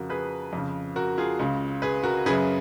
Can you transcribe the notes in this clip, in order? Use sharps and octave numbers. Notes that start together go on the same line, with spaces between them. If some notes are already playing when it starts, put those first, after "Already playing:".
Already playing: F2 C#3 F#4 A#4
G#4 B4
F2 C#3
F#4 A#4
F4 G#4
C#2 C#3
G#4 B4
F#4 A#4
F#2 C#3 G#4 B4